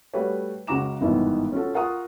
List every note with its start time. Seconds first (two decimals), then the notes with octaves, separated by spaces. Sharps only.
0.13 G3 A3 F#4 B4 C#5
0.67 C#2 C#3 F#4 A#5 D6 E7
1.01 G1 G#2 B2 D#3 E3 B3
1.52 C#4 F4 F#4 A4
1.74 F4 A#4 F#5 A#5 C#6 D#6